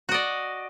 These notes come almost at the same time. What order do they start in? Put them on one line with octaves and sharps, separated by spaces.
F#4 D#5 D5